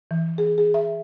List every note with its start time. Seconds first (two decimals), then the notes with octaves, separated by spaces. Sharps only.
0.11 E3
0.38 G#4
0.58 G#4
0.74 E5